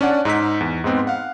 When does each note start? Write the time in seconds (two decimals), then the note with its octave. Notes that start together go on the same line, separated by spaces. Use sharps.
0.01 C#4 D4 D5 F#5
0.25 G#2 D#4 E6 B6
0.61 E2
0.84 G#2 G#3 B3 C4
1.07 F5 F#5